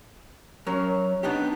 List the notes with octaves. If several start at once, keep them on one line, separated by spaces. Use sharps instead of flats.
F#3 C#4 A#4
B3 D4 D#4 G4